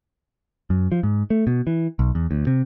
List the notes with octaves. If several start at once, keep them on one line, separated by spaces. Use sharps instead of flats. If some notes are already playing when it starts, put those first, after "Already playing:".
F#2
F3
G#2
A3
B2
E3
B1
E2
D2
C3